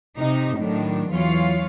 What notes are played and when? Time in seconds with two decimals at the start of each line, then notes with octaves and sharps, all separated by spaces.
0.18 C3 D#4
0.57 A2 D#3 F#3 D4
1.10 E2 E3 F#3 F4 C#5 F5